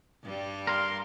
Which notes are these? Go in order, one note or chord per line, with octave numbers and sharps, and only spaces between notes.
G2 G3
A#4 F5 C6